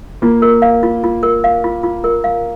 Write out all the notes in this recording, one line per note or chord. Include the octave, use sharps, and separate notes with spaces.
A#3 F4
A#4
F5
F4
F4
A#4
F5
F4
F4
A#4
F5